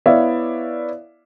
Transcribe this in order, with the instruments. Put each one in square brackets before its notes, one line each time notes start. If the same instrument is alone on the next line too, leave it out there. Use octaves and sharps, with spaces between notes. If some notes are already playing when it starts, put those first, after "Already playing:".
[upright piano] B3 E4 C#5 D5 E5 F5